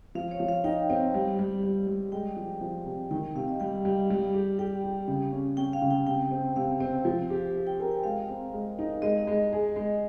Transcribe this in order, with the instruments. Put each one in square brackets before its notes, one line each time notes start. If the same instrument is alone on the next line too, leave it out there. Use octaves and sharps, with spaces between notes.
[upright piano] F3 [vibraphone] F5
[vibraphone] C#5
[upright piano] F3
[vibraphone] F5
[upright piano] D#4 [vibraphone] G5
[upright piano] C4
G3
G3
G3
G3
[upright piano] G#3 [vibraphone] G5
[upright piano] F3
F3
C3
[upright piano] D#3 [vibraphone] G5
[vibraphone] G5
[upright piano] C3 [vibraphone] F5
[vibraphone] D#5
[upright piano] G3 [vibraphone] G5
[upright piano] G3
G3
G4
[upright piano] G4 [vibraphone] G5
[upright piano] G4
C#3
C#4
[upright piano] C#4 [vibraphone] G5
[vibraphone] F5
[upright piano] C#3
[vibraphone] G5
[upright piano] C3 [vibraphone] G5
[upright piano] C4
[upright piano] C3 [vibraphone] F5
[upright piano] C4
F3
G4
G4
[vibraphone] G5
[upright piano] A#4 [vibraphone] G#5
[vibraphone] G5
[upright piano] G#3 [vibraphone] F5
[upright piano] C4
G#3
D#4
[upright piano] G#3 [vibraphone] D#5
[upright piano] G#3
G#4
G#3